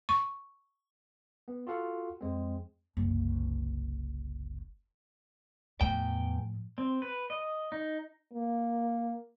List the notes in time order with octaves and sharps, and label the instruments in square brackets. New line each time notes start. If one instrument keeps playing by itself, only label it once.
[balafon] C#6
[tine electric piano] B3
F4 F#4 A4 F5 F#5
F2 G#3 C4
[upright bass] F#1 C2
[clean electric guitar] E2 G5 [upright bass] A2 F3
[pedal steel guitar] C4
B4
D#5
D#4
[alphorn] A#3